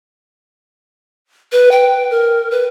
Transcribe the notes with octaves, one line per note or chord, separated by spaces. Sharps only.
B4
G5
A#4
B4